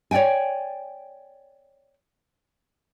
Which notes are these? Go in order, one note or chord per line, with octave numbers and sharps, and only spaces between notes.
C#5 D5 E5 G5 G#5